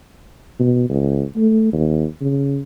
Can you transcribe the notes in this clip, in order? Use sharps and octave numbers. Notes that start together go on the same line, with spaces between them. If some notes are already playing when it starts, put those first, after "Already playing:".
B2
C#2
A3
D#2
C#3